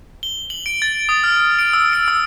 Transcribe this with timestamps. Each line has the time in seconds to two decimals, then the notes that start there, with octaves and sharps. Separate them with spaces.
0.23 G7
0.50 F#7
0.66 D7
0.82 A6
1.09 D#6
1.24 F6
1.59 D7
1.73 E6
1.93 D7
2.08 E6